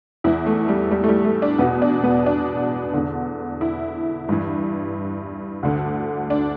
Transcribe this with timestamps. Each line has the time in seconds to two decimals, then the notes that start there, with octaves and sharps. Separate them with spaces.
0.24 E2 E3 E4
0.46 A3
0.68 G3
0.91 G3
1.04 A3
1.08 G3
1.25 A3
1.42 D4
1.59 E2 B3
1.62 B2
1.82 D4
2.04 B3
2.26 D4
2.93 E2 D3
3.61 E4
4.29 G2 E3
5.63 D2 D3
6.30 D4